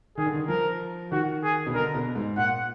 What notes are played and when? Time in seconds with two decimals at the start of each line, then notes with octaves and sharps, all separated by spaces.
0.17 D#3 G#4
0.26 D3
0.34 D#3
0.48 F3 A#4
1.12 D#3 F#4
1.43 G#4
1.67 B2
1.74 D3 A#4
1.94 B2
2.15 G#2
2.37 A#2 F#5